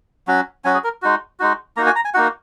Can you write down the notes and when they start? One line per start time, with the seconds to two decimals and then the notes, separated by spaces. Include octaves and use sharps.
0.27 F#3 C#4 F#4
0.65 F#3 C#4 F#4 G#5
0.74 G#4
0.84 A#4
1.02 G#3 D#4 F#4
1.40 G#3 D#4 F#4
1.77 A#3 D#4 F#4 A#5
1.87 G#5
1.96 A#5
2.05 G#5
2.14 A#3 D#4 F#4 F#5